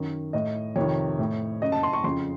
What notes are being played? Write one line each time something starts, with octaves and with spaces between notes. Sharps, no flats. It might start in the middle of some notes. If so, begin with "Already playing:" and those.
Already playing: F#2 D#3
A2 D#5
F2 C3 D#3 C#5
A2
F#2 C#3 D#5
A5
C6
C#6
F2 C#3 C6